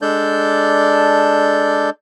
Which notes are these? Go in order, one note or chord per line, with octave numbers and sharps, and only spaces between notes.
G#3 D4 A4 D5 G6